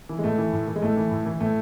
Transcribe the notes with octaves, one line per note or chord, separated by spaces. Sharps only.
E3
G#3
A2 A3
E3
A2
E3
G#3
A2 A3
E3
A2
E3
A2 A3